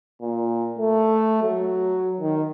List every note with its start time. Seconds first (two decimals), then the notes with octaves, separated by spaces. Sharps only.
0.21 A#2
0.79 A3
1.43 F#3
2.20 D#3